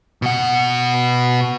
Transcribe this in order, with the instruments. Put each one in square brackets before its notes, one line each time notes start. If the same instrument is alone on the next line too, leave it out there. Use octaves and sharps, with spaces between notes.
[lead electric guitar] B2 F#5